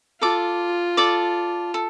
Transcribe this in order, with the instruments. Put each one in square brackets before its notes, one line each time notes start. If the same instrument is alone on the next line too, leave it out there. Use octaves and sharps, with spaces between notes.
[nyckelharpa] F4 [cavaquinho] A4 D5 A5 D6
[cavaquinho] A4 D5 A5 D6
A4